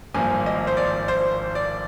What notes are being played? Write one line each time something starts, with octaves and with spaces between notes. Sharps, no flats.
G#1 G2 F3 A#3 G#5
D#5
C5
D5
C5
D5